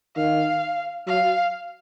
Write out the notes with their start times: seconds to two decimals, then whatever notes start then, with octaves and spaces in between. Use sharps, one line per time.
0.16 D#3 F5
1.07 F#3 F5